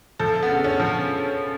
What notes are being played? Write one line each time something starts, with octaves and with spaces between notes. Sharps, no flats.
F3 A4
B3
C#3
C#4
F3